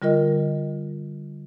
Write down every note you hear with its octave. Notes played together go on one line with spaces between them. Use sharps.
D3 G3 F4 A#4 D#5